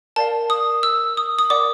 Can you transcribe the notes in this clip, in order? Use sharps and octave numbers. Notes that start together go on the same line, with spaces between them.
A#4 D5 F5 A5
D#6
E6
D#6
D#6
A#4 D5 F#5 D6